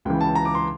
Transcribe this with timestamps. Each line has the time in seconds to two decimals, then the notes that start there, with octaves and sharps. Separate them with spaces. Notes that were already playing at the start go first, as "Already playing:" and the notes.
0.05 C#2 C#3 E3 G5
0.21 A5
0.35 A#5
0.45 D6
0.55 C6